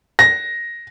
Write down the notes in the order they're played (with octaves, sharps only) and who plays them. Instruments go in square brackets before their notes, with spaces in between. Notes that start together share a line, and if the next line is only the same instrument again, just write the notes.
[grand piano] A#6